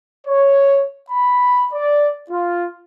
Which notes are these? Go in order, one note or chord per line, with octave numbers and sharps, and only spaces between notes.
C#5
B5
D5
F4